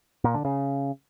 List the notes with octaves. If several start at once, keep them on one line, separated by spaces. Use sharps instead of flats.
A#2
D3
C#3